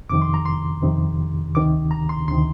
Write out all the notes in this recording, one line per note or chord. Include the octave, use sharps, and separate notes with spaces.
F2 C3 D#3 D6
C6
A#5
C6
F2 C3 D#3
D2 C3 D#3 D6
A#5
C6
D2 C3 D#3 C6